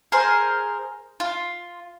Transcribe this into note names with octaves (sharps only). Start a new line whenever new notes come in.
G#4 A#4 C5
F4